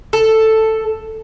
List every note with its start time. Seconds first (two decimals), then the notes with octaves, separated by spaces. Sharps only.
0.13 A4